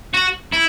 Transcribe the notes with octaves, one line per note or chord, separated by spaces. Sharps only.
F#4
E4